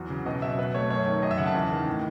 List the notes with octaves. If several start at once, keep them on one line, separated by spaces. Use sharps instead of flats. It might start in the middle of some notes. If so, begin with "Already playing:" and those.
Already playing: E2 F#3
C#3
B2 D#5
F#3 E5
B2 B4
A3 C#5
F#2 C#5
D#3
F#2 D#5
E5
C#3 F#5
A5
E2
D#3
A2